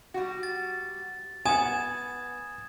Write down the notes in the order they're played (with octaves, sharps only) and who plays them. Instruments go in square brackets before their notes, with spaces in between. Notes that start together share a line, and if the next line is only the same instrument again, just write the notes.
[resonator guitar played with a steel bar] G3 F#4
[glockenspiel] A6
[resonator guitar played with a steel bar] B3 F#5 [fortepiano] G#5 [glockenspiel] D#6 G#6 E7